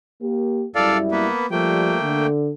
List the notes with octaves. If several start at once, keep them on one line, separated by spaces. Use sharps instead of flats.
A#3 G4
F#2 G3 E4 A4 D5 F5
A#3 B3 B4
F3 G3 A3 A#3 G5
D3